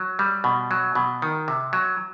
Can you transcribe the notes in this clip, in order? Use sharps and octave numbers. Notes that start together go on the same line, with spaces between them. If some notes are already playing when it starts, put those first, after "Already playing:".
Already playing: F#3
G3
B2
F#3
B2
D#3
C3
F#3